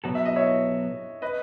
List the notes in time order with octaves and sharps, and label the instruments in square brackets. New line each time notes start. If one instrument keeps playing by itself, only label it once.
[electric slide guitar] B2 F#3 B3 F#4 A4
[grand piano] E5
D#5
C#5 E5
B4 D#5